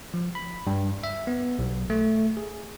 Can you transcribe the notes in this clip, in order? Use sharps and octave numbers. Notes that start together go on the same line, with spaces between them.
F3
B5
G2
E5
B3
B1
A3
G#4